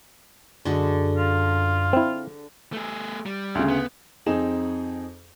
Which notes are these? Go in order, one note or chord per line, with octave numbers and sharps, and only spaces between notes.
F#2 D3 G#3 F#4
F4
C4 E4
A3 G#4
G3
D2 C#3
B3
F2 C4 D#4 G#4 E7